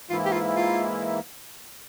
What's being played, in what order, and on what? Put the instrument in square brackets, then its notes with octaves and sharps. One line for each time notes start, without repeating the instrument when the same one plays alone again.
[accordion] G#2 E3 A#3 E4 [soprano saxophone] F4
[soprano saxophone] G4
F4
F4